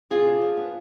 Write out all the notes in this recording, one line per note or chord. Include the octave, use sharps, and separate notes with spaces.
C3 F4 G#4
D4
F3
B3